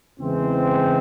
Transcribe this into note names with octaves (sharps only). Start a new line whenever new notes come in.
E2 C#3 E3 G#3 C4